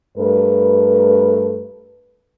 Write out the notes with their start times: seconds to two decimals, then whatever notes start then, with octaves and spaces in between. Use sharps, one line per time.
0.18 G2 A3 A#4 B4